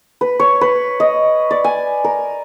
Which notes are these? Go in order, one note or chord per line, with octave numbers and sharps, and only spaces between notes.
B4
C#5
B4
D#5
D5
G#5
A#4